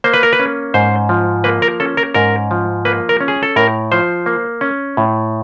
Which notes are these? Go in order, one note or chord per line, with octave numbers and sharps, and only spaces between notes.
A#3 C5
B4
A#4
B4
C#4
G#2 C5
F3
A#3 B4
A#4
C#4 A4
A#4
G#2 A#4
F3
A#3 B4
A#4
C#4
G#4
A4
A2 A#4
F3 C5
A#3
C#4
A2